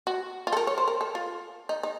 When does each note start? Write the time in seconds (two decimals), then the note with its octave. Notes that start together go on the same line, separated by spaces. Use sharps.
0.07 F#4
0.47 F4
0.53 A4
0.57 A#4
0.67 C#5
0.78 C5
0.88 A#4
1.01 A4
1.15 F4
1.69 D#4
1.83 D#4